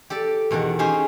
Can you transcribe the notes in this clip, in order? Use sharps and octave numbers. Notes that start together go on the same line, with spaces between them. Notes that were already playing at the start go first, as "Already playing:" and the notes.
G4 A4 D5
E2 B2 D#3 F#5
C#4 D#4 G4 G#4 C5 G#5